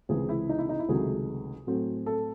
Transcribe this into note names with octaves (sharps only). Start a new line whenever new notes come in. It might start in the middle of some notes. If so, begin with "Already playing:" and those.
C#2 C3 E3 C4 G#4
E4
D#4
E4
D#4
E4
C#2 C3 D#3 F#3 A3 G#4
A2 F#3 A3 C4
A4